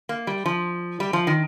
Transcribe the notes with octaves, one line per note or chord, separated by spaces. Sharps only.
A#3
G3
F3
G3
F3
D#3